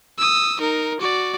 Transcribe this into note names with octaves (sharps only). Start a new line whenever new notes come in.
D#6 E6
D#4 A#4
F#4 D5